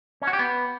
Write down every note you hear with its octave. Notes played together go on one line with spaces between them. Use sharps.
C#4
F#4
G4
B3